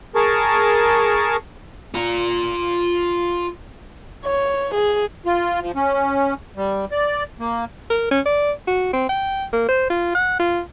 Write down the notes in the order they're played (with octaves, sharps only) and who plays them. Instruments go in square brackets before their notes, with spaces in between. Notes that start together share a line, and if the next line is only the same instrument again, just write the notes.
[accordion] G#4 A#4 A5 C#6
[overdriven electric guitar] F4 A#5
[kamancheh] C#5
G#4
[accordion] F4
F3
C#4
G3
D5
A#3
[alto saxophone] A#4
C#4
D5
F#4
C4
G5
A#3
C5
F4
F#5
F4